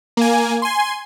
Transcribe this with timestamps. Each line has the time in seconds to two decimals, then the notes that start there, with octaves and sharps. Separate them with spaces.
0.17 A#3 G#5
0.62 G#5 C6